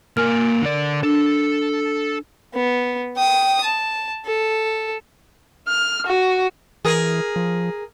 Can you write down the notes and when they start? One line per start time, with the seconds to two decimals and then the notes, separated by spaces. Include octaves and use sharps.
0.17 A#3 A#4 G#5 F6
0.62 D3 D5
1.03 D4 A4
2.54 B3
3.17 G5 D#6
3.64 A5
4.25 A4
5.68 F6
6.07 F#4
6.85 E3 G#4 A#4
7.36 F3